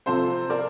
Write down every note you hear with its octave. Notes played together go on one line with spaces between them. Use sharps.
C3 F3 C4 A4 C5
A#4 D5